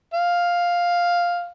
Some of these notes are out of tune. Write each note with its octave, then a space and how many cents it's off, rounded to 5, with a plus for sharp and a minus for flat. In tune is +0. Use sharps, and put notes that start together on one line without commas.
F5 +5